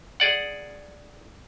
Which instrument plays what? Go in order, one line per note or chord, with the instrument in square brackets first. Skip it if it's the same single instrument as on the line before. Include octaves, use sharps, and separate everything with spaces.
[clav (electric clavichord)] G#4 D5 F#5